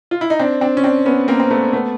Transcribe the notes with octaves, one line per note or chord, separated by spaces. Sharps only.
F4
E4
D#4
C4 D4
C4 D4
C#4
C4 D4
B3 C#4
A#3 C4
C4
A3 B3
A3 B3